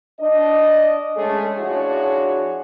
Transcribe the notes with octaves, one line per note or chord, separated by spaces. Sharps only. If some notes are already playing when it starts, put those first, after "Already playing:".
D4 D#5
G#3 A3 C#4 G#4 A4
F3 D4 E4 F#4 G#4 C#5